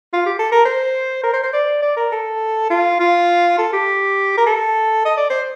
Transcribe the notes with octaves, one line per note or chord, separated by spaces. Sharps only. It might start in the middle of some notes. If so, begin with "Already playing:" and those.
F4
G4
A4
A#4
C5
A#4
C5
C5
D5
D5
A#4
A4
F4
F4
A4
G4
A#4
A4
D#5
D5
C5